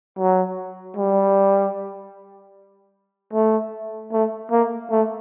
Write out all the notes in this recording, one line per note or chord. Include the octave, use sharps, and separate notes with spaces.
F#3
G3
A3
A3
A#3
A3